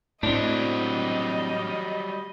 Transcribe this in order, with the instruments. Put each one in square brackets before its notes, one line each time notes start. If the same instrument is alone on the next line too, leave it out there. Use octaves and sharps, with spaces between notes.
[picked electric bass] A2 [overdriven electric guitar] F#3 G3 [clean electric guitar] C4 D4 [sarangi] D#5